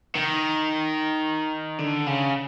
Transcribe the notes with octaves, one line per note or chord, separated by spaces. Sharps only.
D#3
D3
C#3